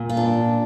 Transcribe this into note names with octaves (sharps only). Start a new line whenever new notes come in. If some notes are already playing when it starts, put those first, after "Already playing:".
Already playing: A#2
F4
D4